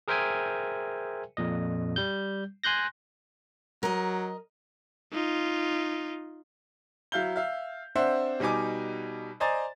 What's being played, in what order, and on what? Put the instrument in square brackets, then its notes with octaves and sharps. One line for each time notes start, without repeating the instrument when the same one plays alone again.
[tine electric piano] G#4 A#4 C5 E5 G5 G#5
F2 A#2 D#5
G3 G6
G#5 C6 F#6 G6 A#6
[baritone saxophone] F#3 [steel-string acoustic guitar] A#4 D#5
[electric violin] D#4 F4
[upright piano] F#3 E4 F5 G6 G7
E5 F5
C4 D4 C5 E5 F#5
B2 G3 D#4 G#5 D6
C5 D5 D#5 G#5 A#5 A6